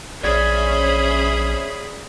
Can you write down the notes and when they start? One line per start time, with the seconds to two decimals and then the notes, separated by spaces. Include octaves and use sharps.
0.23 A#1 C#4 G#4 C5 D5 E5 B5 G#6